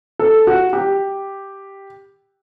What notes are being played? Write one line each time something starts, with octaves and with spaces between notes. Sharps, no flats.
A4
F#4
G4